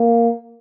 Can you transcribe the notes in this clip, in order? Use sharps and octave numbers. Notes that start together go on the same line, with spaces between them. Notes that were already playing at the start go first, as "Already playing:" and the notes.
Already playing: A#3